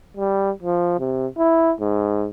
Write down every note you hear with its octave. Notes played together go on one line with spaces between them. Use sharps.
G3
F3
C3
E4
G#2